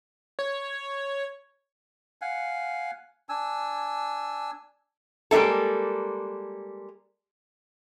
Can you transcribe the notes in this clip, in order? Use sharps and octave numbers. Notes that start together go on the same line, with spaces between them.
C#5
F5 F#5 G#5
D4 G#5 E6
G3 G#3 A#3 E4 A4